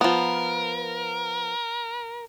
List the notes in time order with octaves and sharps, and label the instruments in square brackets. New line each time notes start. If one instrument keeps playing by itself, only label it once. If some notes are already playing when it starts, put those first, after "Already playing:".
[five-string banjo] F3 B3 [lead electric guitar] A#4